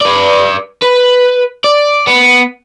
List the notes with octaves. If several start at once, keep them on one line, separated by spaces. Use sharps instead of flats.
B4 D5
B4
D5
B3